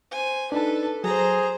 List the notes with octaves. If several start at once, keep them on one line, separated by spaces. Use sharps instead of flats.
C5 G#5
D4 D#4 A4 B4 A5
F#3 G#4 C5 A#5